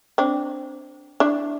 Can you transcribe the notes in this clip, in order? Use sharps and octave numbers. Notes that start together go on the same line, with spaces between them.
C4 D4
D4 E4